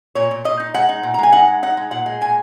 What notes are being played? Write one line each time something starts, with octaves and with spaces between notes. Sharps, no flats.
A#2 C#5
A#2
A#2 D#5
D#4
G#3 F#5
D#4
A#2
A#5
G#3 G#5
D#4 F#5
G#3
D#4 F#5
G#3
A#2 F#5
G#3
A#2 G#5